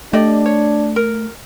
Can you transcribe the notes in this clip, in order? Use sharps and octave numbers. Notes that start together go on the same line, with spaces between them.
A3 D4 G4 D5 D#5
C#5
A#4